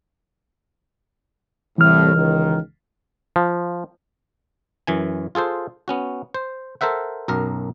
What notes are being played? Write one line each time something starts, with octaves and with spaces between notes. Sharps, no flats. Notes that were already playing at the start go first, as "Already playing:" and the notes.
C2 A2 E3 F6
C#2 D#3
F3
F#2 E3 G#5
F4 G#4 A4 C5
B3 C#4 F#4
C5
A4 A#4 C5 E5 F#5
B1 F#2 A#4